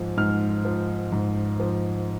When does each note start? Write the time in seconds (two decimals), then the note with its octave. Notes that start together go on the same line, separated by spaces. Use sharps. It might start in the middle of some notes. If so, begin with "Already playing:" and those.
Already playing: G#2 F3
0.17 G#2 F6
0.65 F3
1.12 G#2
1.60 F3